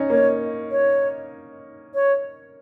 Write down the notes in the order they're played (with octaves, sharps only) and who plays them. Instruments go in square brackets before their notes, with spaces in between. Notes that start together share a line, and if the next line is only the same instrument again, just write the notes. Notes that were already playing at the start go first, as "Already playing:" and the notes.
Already playing: [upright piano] C#4 D#4
[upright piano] A#3 [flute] C#5
[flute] C#5
C#5